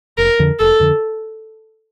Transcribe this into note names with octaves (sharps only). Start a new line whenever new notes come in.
F1 A#4
F2 D3
F1 A4
F2 D3